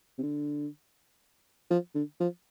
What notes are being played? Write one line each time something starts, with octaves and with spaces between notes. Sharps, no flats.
C3
D3
F3
D3
F3